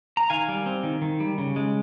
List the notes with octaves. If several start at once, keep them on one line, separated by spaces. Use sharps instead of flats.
A#5
D#3 F5 G#5
G3
C4
D#3
D#3
G3
C#3
G#3